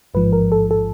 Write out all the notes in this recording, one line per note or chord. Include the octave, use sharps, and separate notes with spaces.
A1 G#2 F3 B4
A#4
A4
A4